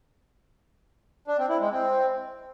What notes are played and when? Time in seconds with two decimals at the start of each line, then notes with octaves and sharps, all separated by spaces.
1.28 D4
1.38 C4
1.49 E4
1.60 G#3
1.71 C4